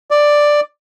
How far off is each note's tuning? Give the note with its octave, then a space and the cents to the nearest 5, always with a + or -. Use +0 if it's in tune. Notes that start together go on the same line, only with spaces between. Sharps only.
D5 +5